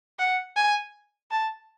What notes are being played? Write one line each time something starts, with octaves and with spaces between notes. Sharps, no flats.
F#5
G#5
A5